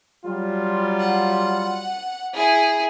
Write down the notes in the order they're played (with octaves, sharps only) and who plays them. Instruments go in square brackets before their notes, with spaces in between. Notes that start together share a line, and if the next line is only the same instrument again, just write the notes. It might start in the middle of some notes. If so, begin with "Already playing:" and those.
[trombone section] F#3 G3 F4
[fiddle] F#5
E4 G#4